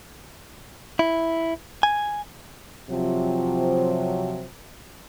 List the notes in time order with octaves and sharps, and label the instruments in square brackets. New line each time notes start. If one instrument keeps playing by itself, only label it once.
[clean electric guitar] E4
G#5
[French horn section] C3 F3 F#3